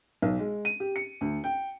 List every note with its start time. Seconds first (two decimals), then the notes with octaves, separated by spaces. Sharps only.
0.22 B1
0.39 G#3
0.65 D#7
0.80 G4
0.96 C#7
1.21 D2
1.44 G5